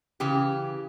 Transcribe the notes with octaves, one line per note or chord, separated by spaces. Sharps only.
C#3 E3 G4